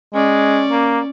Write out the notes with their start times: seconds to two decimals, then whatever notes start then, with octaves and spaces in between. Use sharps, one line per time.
0.14 G#3 C#4 D5
0.71 A#3